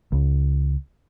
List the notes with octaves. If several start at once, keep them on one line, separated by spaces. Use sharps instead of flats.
C#2